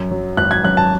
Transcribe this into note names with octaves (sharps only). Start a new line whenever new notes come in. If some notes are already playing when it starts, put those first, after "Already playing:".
Already playing: F#2
F#3
G#1 F#6
G#6
F#2 F#6
A5